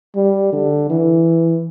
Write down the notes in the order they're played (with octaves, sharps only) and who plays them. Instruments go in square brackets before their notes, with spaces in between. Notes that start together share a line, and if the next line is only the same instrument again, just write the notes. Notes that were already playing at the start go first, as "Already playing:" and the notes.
[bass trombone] G3
D3
E3